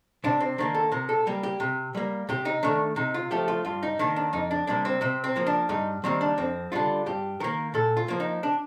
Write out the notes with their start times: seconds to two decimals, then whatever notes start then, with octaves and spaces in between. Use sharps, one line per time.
0.24 C3 D4
0.40 C4
0.58 D#3 A#3 D4
0.74 A4
0.92 C3 A#4
1.09 A4
1.27 G3 A#3 G4
1.43 G4
1.60 C3
1.95 G3 A#3
2.29 C3 G4
2.45 D#4
2.63 D#3 A3 D4
2.96 C3 D#4
3.14 F4
3.31 F3 A3 G4
3.48 F4
3.65 G2 F4
3.83 D#4
3.99 D#3 A#3 D4
4.16 D4
4.33 F2 D#4
4.51 D4
4.67 C3 G3 A#3 D4
4.85 C4
5.01 C3 C4
5.24 C4
5.36 F3 A#3
5.47 D4
5.69 G2 D#4
6.04 D#3 G3 A#3 C4
6.21 D4
6.37 F2 C4
6.72 D3 G3 F4
7.06 G2 G4
7.40 D#3 A#3 A#4
7.74 A#2 A4
7.97 F4
8.08 F3 A#3
8.20 D#4
8.43 D4